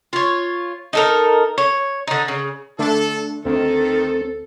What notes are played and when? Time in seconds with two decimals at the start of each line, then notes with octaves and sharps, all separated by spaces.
0.13 F4 C#5
0.93 D#4 A4 A#4
1.58 C#5
2.07 D3 D#4
2.28 C#3
2.79 D3 A3 D4 A4
3.45 D2 D#3 C4 A4